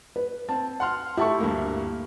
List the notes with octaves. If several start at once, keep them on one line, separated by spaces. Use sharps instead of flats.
B4
C4 A5
F#5 C6 F6
A3 E4 G4 A5 C#6
D2 G2 A#3